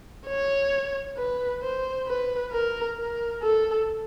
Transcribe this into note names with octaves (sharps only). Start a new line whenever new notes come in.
C#5
B4
C5
B4
A#4
A#4
A4